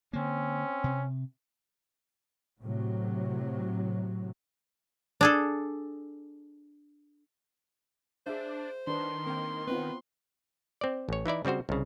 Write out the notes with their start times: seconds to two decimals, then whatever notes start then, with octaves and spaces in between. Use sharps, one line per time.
0.13 D3 A#3 C4 C#4
0.84 C3
2.60 A2 C3 F#3
5.21 D4 G#4 A4
8.27 D4 G#4 C5 E5 F5
8.87 D#3 D4 B4 C6
9.27 A#3 C4 G5
9.67 B3 C4 F4 B4
10.81 C4 D5
11.09 A1 C#5
11.26 E3 D#4 E4 D5
11.45 C#3 G3 C4 F#4 C5
11.69 C2 C#3